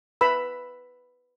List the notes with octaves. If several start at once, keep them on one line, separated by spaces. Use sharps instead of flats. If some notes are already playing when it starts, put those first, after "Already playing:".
B4 B5 E6